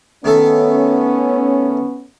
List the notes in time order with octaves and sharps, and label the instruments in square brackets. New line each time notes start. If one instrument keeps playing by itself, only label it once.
[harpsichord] D#3 A3 A4 [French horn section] B3 C#4